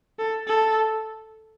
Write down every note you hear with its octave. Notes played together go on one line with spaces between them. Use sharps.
A4
A4